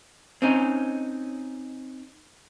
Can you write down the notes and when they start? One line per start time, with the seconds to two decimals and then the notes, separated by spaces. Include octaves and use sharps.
0.42 C4 C#4 D#4